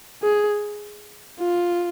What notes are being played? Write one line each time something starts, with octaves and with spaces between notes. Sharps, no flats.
G#4
F4